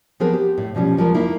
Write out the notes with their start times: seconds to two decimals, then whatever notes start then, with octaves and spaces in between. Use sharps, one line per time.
0.20 F3 B3 C4 G#4 A#4 B4
0.33 G4
0.58 A2
0.75 B2 F3 G3 C#4
0.97 E2 F3 G#3 A#4
1.15 A#3 D#4 E4